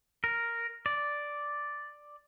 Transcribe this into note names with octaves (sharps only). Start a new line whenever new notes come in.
A#4
D5